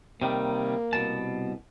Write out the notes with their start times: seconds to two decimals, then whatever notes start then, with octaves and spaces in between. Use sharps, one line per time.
0.22 C3 D#3 G3 A#3
0.93 C2 B2 A5